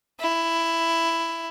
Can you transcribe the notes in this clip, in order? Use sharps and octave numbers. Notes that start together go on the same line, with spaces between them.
E4